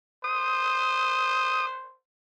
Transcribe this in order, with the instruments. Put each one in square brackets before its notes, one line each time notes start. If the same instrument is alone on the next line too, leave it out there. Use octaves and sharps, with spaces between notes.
[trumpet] C5 [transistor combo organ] D#6